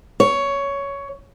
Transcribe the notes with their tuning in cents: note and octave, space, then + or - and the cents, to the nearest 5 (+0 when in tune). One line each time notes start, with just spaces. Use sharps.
C#5 +10